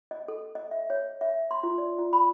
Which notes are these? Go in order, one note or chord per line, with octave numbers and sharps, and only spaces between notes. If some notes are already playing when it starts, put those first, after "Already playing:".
D#5
A4
D#5
E5
C#5
E5
C6
F4
D5
F4
B5